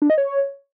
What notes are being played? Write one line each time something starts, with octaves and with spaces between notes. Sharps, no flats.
D4
D#5
C#5